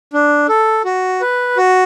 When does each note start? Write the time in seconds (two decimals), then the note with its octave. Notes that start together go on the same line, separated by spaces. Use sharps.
0.13 D4
0.49 A4
0.85 F#4
1.21 B4
1.57 F#4